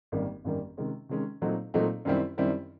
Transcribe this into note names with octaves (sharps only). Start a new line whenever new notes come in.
G#1 F#2 D#3 G3 A#3
G#1 F#2 D#3 G3 A#3
C3 D#3 G#3 C#4
C3 D#3 G#3 C#4
A#2 F#3 A3 C4 D#4
A#2 F#3 A3 C4 D#4
F#2 D#3 G3 C4 E4
F#2 D#3 G3 C4 E4